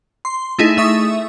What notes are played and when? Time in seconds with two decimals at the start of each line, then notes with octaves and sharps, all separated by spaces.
0.25 C6
0.59 A3 D#4 E4 G#4
0.77 A3 E5 C#6 D#6